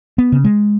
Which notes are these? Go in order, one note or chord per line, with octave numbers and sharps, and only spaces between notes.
B3
C#3
G#3